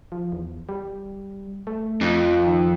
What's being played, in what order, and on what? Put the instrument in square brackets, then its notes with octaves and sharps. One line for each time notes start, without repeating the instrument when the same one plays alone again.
[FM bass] F3
E2
G3
A3
[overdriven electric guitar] F2
[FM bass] D#3